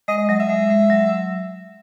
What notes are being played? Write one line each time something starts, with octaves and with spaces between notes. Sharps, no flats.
G#3 D#5
D#5
F#3 D#5
E5
G#3
G#3
F#3